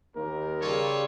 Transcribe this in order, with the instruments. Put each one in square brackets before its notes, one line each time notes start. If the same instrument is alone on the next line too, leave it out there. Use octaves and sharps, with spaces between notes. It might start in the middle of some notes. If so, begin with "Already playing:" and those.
[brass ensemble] D#2 [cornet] A#4
[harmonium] C#3 G3 G4 [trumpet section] F4 A4 C#5